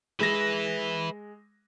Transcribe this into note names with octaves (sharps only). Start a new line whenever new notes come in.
G#3 B4 E5 A#6